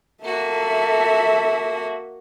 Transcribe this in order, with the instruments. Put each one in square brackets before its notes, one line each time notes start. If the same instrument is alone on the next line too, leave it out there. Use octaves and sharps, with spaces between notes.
[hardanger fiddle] A#3 F#4 [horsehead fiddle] A4 E5